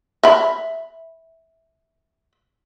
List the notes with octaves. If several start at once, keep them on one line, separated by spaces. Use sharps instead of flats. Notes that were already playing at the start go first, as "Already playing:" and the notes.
E5 B5